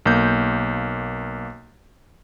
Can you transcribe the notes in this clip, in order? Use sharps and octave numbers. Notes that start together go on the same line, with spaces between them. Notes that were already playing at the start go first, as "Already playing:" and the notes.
B1 A#3 G6